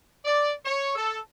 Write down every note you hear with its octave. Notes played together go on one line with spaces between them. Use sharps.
D5
C#5
A4